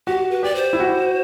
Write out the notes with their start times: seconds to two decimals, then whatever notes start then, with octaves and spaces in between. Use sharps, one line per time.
0.07 F#4 G4
0.31 B4
0.43 G4 D5
0.55 C5
0.73 E4
0.80 F#4